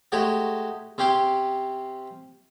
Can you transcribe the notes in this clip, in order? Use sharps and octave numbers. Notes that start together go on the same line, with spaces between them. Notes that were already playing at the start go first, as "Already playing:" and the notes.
G#3 A3 F#4 G4 C#5 F#5
C3 C#4 G4 C6 D6